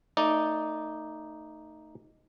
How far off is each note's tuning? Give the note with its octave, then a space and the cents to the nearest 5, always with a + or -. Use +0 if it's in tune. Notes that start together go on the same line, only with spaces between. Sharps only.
A3 +30 D#4 +0 D5 +0